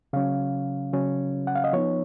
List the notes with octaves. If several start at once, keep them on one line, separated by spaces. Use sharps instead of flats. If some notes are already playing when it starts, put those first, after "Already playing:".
C#3 F#3 C#4 F5
C#3 F#3 C#4
F#5
F5
D#5
F3 B3 D#4 C#5